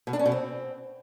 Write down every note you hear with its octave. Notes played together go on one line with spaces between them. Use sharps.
B2
D4
C#4
B2
C4